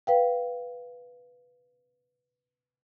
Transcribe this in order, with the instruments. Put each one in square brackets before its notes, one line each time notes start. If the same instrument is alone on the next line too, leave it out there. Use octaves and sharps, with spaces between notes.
[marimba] B4 F5 G5